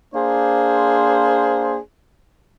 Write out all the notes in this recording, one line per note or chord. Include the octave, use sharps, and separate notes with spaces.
A#3 D4 G#4 C5